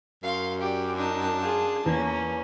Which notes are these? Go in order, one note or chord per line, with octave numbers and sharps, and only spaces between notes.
F#2 F5 C6
G4 D5
D4 D#4 A5
F4 G#4
E2 A#3 C#4